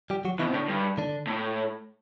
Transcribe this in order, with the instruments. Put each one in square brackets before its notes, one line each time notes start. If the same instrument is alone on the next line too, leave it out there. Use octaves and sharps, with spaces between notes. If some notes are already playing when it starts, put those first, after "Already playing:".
[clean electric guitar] G3 G4
F#3 F#4
[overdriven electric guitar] B2 [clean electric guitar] E3 E4
[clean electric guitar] C4
[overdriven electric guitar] A2 [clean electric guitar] D3 D4
[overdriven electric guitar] G2
[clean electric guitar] D3 D4
[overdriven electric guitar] A2